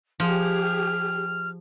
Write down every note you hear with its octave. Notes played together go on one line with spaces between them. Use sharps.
F3 G4 G#4 F6